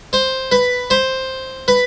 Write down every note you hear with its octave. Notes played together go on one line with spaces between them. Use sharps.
C5
B4
C5
B4